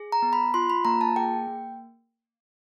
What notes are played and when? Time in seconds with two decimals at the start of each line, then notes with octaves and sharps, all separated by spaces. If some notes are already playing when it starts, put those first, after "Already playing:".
Already playing: G#4
0.12 A#5
0.22 B3
0.33 B5
0.54 F4 C6
0.70 B5
0.85 A#3 A#5
1.01 A5
1.16 G#4 G5
1.47 A#3